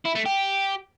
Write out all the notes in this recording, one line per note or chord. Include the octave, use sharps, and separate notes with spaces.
E4
A3
G4